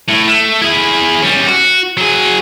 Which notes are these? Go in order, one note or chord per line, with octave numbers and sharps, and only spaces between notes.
A2
A3
E4 G#4
G3 C#4
F#4
F#3 G#4